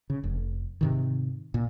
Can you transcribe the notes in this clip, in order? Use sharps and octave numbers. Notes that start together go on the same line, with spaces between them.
C#3
F1
G#2 C3 D#3
A#2